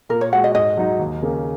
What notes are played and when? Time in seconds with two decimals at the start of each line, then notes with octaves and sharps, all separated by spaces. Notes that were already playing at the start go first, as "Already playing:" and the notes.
0.09 A#2 A#4
0.21 C#5
0.33 G#3 F#4 F#5
0.44 D#5
0.55 G#2 D#5
0.77 F#3 D#4 F#4
0.99 D#2
1.22 C#3 A#3 C#4